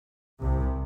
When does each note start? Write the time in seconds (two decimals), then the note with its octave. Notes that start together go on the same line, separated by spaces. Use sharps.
0.41 C2 C3